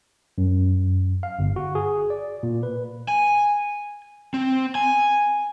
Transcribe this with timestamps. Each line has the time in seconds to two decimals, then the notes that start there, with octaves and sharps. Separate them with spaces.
0.38 F#2
1.23 F5
1.39 G1
1.56 F#4
1.75 G#4
2.10 D5
2.43 A#2
2.63 B4
3.08 G#5
4.34 C4
4.75 G#5